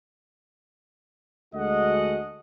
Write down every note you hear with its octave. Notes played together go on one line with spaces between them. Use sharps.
D2 G#3 F#4 A4 D#5 F#5